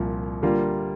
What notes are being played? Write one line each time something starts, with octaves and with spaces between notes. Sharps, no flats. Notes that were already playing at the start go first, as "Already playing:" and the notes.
Already playing: C2 A#2 F3
D3 G3 A#3 F4